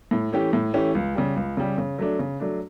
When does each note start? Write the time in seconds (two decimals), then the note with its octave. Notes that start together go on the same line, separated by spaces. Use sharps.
0.11 A2
0.33 E3 A3 C#4 G4
0.53 A2
0.74 E3 A3 C#4 G4
0.95 C#2
1.15 C#3 G3
1.36 C#2
1.57 C#3 G3
1.78 C#3
1.99 F#3 A3 D4
2.19 C#3
2.40 F#3 A3 D4